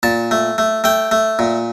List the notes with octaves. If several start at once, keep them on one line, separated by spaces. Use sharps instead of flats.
A#2 A5
A3
A3
A3 G5
A3
A#2